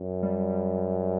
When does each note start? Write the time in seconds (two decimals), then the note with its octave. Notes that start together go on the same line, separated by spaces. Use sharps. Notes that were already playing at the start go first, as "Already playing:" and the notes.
Already playing: F#2
0.23 G3